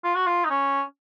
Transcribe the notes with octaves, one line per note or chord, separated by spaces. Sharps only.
F4
F#4
F4
D#4
C#4